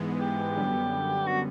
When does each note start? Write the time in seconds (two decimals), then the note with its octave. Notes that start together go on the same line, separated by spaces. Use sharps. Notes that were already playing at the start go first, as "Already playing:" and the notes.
Already playing: G#2 E3 G#3 B3
0.20 G4
0.56 F#2 D3 G3 B3
1.27 F#4